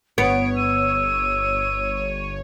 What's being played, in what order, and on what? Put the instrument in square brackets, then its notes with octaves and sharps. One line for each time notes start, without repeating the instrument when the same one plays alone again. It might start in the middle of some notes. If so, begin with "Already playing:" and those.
[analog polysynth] G1 C#5 [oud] B3 [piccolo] D7
[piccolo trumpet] E6 [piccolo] D#7